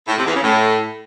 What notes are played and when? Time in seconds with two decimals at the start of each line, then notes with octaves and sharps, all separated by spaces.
0.08 A2
0.16 C3
0.25 E2
0.34 C#3
0.43 A2